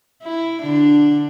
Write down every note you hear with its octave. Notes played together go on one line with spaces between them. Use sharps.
E4
D3 D4